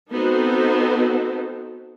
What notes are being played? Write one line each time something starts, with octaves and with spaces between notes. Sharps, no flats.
B3 C4 D#4 F#4 A4 C5